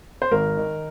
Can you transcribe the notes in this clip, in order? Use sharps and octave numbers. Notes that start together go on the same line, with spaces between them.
C5
G#1 A#4
D#3